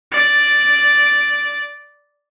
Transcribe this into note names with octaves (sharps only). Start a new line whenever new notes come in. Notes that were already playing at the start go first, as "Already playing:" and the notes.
D5 D7